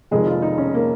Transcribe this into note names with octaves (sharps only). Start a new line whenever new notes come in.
F1 F2 D#3 G#3 G#4
F4
D#4
C#4
A#3